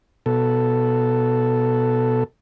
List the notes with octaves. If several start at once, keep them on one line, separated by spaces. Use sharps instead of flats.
B2 A4